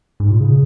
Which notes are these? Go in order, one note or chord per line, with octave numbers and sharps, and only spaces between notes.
G#2
A#2
C#3